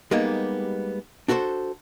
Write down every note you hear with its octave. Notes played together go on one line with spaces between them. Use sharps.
G3 G#3 A#3 B3 D#4 G4
D4 F#4 A4 B4 C5